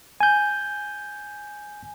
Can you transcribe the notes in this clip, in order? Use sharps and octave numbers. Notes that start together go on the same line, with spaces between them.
G#5 G6